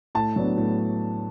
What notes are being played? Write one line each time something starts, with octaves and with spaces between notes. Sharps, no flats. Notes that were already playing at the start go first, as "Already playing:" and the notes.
A2 A5
F#3 B3 D4
A2